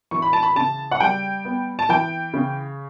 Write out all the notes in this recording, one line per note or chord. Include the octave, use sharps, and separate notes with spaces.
E3 C#6
B5
A5
B5
C#3 A5
F#5
G3 G5
B3
A5
E3 G5
C#3